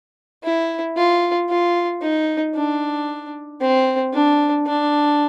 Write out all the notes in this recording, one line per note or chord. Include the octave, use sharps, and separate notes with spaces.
E4
F4
F4
D#4
D4
C4
D4
D4